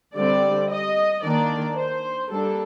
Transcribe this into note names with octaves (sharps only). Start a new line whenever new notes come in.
D3 G3 C4 D5
D#5
D#3 A#3 D4 D5
C5
G3 A#3 D4 A4